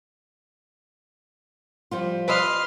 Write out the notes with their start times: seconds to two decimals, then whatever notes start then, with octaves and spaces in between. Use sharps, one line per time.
1.91 F3 G3 F4
2.28 B4 D#5 C6 F6